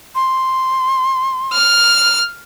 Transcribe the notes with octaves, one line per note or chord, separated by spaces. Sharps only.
C6
F6